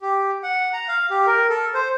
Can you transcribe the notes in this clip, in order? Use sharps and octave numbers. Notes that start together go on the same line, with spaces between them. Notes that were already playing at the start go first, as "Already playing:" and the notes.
G4
F#5
A#5
F5
G4
A#4
A4
C5